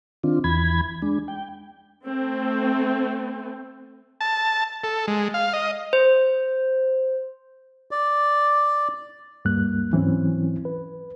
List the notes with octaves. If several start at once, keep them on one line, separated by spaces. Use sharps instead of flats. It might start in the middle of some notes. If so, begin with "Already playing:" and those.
D#3 C4 D4 F4
E2 E3 B5 G#6
G#3 D4
G5
A3 C4
A5
A4
G#3
F5
D#5
C5
D5
D2 G2 G3 A#3 F#6
G#2 E3 F#3 C4 C#4 E4
B4